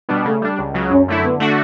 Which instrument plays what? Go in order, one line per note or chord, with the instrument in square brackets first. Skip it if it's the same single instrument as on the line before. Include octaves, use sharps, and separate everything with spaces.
[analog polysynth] B2 G3 B3 D4
[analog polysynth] C#3 [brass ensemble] A3
[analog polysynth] G3 D4
C#2
C#3 F#3
[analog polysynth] F#2 [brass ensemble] C#4
[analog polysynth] D3 A3 E4
[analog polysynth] D3 [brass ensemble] B3
[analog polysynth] A3 D4 F#4